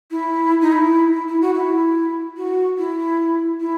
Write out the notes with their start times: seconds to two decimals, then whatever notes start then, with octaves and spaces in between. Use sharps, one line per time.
0.11 E4
0.61 D#4
0.72 E4
1.13 E4
1.28 E4
1.41 F#4
1.55 E4
2.37 F#4
2.78 E4
3.60 E4